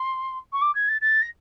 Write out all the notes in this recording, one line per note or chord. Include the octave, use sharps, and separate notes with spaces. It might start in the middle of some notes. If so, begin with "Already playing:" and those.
Already playing: C6
C#6
D6
G#6
A6
A6
A#6